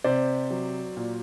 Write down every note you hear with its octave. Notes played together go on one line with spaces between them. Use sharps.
C3 C5 D5
F#3
A#2